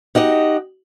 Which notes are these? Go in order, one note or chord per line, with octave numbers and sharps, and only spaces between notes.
D#4 F#4 G4 D#5